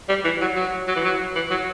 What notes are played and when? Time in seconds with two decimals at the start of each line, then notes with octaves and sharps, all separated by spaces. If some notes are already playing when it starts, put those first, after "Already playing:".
0.09 G3
0.25 E3
0.41 F#3
0.56 F#3
0.88 F#3
0.96 E3
1.04 F#3
1.36 E3
1.51 F#3